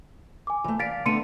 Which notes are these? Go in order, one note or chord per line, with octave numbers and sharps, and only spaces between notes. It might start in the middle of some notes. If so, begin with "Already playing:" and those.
G#5 D6
E3 A3
F5 A6 B6 D7
D3 A3 B3 C6 C#7 D#7